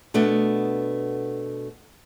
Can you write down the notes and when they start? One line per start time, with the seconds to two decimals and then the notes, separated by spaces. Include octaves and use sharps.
0.14 B2 A3 B3 D4